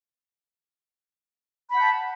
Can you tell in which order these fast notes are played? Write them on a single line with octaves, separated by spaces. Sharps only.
B5 F#5 G6 A5